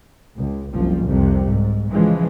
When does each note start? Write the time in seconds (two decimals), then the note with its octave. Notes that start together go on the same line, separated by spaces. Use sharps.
0.37 C#2
0.72 F#1 C2 F3
1.05 C2 F2 C3
1.47 G#2
1.90 C#3 E3 F3 G#3